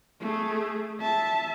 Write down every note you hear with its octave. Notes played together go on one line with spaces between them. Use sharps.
A3 G#4
E5 A5